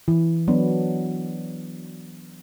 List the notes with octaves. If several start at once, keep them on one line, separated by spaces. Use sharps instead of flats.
E3
F#3 B3 D4